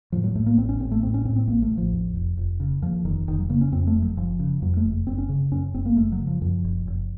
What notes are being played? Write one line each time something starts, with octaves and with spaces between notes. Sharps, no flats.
A2 F3
F#3
A2 A3
A#3
A1 C4
C#4
A1 C4
A3
A2 C4
C#4
A2 C4
C4
A1 A#3
A3
A1
F3
D#2
F1
F1
C#3
D#2 F3
F1 D#3
F1 D#3
F#3
C#3 A#3
C#4
F2 C4
A3
F#1
F#3
F#1 F3
C#3
F2 F#3
A3
F#1
F#1 C4
C#4
C#3
F#2 C#4
F#1 C4
A#3
F#1 A3
F#3
C#3
F3
F#2 F3
F#1
F#1